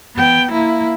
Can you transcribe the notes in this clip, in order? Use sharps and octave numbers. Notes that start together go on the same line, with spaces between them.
B3 G5
A#3 E4